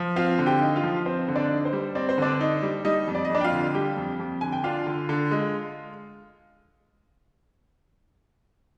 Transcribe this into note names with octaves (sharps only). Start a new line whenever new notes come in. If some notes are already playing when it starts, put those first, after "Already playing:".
Already playing: F3
C4 F4 F5
D3
G4 G5
D#4
F4 F5
F3
C4 C5
D3
D4 D5
D#4
C5
G3
C4 D5
C5
D3 D4 D5
D#4
G3
G3 D#4 D#5
F2
D5
D#5
F2 D4 D5
G5
F4 F5
D3
G3 G4 G5
F2
F2
D3 G#5
G5
D4 F4 F5
D3
D3
G#3